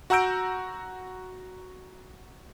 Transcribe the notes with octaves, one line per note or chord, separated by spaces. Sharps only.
F#4 F#5 A#5 E6 G6 D7